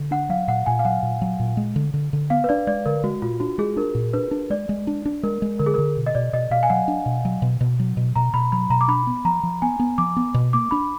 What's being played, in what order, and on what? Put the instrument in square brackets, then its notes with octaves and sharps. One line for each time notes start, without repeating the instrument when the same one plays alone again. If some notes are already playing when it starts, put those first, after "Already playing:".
Already playing: [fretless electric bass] D3
[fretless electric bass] D4 [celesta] F#5
[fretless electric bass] F#3 [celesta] F5
[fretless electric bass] A#2 [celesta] F#5
[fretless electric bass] A#2 [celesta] G#5
[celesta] F5
[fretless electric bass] F#3 [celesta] F#5
[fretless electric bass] A#2
F#3
A#2
G#3
D3
D3
D3
[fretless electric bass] B3 [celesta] F5
[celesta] B4
[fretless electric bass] D4 [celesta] D5
[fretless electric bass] G#3 [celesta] D5
[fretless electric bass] D3 [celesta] A#4
[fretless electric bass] G#3 [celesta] F#4
[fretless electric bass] A#2 [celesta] F4
[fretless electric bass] D4 [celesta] F#4
[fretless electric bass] G#3 [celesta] G#4
[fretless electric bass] D4 [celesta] A#4
[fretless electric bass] A#2
[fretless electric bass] D4 [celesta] B4
[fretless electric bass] D4
[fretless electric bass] G#3 [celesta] D5
[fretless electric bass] G#3
D4
D4
[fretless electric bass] G#3 [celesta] A#4
[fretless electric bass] G#3
[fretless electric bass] D3 [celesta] A#4
[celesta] G#4
A#4
[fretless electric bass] D3
B2
[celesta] D#5
[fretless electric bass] B2 [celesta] D5
[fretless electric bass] B2 [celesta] D#5
[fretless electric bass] B2 [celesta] F5
[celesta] G#5
[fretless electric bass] F#3 [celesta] F#5
[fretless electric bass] D4
B2
F#3
B2
B2
F#3
B2
[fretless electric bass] B2 [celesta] A#5
[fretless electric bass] B2 [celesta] B5
[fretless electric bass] F#3 [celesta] B5
[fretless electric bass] B2 [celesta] A#5
[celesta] D6
[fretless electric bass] D4 [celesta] B5
[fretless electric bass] B3
[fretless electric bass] F3 [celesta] A#5
[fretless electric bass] F3
[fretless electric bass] B3 [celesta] G#5
[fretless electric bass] B3
[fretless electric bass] F3 [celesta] D6
[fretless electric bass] B3
B2
[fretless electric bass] A#3 [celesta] D6
[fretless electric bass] D4 [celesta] B5